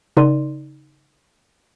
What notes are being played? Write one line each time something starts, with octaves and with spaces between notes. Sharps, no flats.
C#3 D#4 A#4 D5 C6 D#7